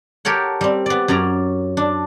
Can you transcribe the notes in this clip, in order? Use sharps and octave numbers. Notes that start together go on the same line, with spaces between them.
G4 A4 A#4 C#5 F#5
G3 C4
B3 D5
F#2 C#4 D5 A#5
D4